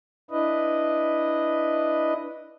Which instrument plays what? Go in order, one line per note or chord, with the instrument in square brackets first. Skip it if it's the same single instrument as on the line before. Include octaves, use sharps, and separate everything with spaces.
[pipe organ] D4 E4 B4 D#5